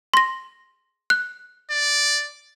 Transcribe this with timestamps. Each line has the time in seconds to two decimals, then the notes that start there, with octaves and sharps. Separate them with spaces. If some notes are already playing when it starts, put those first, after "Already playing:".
0.14 C6 A#6
1.10 F#6
1.71 D5